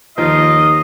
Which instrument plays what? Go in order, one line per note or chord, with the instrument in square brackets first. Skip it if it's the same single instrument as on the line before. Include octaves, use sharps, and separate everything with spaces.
[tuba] D#2 [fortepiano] D#3 F3 [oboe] F4 [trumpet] D#5